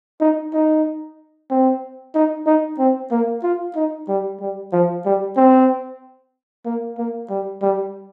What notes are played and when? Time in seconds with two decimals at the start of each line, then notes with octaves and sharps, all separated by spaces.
0.21 D#4
0.53 D#4
1.50 C4
2.15 D#4
2.47 D#4
2.79 C4
3.11 A#3
3.43 F4
3.75 D#4
4.08 G3
4.41 G3
4.72 F3
5.05 G3
5.36 C4
6.65 A#3
6.99 A#3
7.30 G3
7.62 G3